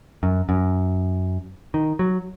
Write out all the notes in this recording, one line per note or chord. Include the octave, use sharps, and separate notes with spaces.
F#2
F#2
D#3
F#3